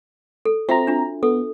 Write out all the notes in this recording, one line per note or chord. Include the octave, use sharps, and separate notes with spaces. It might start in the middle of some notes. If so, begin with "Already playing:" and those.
A4
C4 F4 F#4 E5 A#5
D4 F4
B3 A4